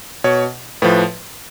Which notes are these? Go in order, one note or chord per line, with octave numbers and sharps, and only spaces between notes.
B2 C#5
A2 F3 B4